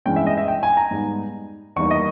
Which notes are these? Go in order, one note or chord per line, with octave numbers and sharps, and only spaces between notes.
G2 E3 G#3 C#4 G5
E5
D#5
E5
G5
G#5
A#5
G#2 G3 B3
E2 D#3 G3 A#3 C#6
D#5